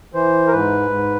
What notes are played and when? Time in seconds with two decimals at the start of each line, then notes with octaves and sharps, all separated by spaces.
0.14 E3 C5
0.47 A#4
0.52 G#2 B4
0.90 G#2